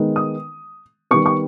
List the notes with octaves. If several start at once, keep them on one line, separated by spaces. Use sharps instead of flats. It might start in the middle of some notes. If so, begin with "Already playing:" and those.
Already playing: D#3 G#3 B3 D#4
D#6
D#3 G3 B3 C#6
C#6